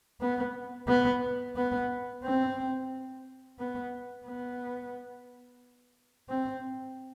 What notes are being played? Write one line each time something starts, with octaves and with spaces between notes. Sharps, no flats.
B3
B3
B3
C4
B3
B3
C4